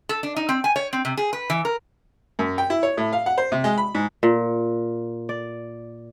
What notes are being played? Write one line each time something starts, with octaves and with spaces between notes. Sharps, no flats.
A4
D4
D#4
C4
G#5
C#5
C4
C3
G#4
B4
E3
A#4
F#2
G5
E4
C#5
A2
F5
F#5
C5
C3
G#3
B5
G#2
A#2
D5